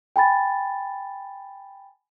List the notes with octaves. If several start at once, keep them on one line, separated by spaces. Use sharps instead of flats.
G5 G#5 B5 A6